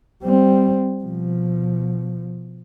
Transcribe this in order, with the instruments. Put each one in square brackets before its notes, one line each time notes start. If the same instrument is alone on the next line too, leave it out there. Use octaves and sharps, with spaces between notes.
[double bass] G3 C4
B2 F3